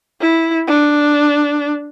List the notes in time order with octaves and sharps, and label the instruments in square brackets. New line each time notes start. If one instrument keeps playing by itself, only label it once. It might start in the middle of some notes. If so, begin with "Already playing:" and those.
[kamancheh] E4
D4